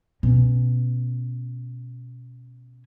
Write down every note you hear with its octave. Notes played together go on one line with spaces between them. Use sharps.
B2 C#4